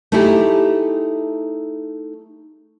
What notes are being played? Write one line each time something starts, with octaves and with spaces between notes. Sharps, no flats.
A3 D#4 E4 G4 G#4